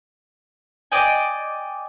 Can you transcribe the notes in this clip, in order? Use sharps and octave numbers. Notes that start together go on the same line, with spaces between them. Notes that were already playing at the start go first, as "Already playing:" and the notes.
D5 D#5 G5 G#5